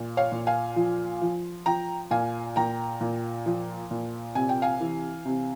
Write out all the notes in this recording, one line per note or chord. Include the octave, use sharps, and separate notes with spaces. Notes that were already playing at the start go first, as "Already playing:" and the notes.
Already playing: A#2
C#5 F5
A#2
F5 G#5
F3
F3
F3 G5 A#5
A#2 F5 G#5
A#2 G5 A#5
A#2
F3
A#2
C3 G#5
G5
F5 G#5
E3
C3